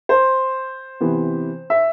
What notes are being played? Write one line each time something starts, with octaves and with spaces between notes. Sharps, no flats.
C5
C3 E3 B3
E5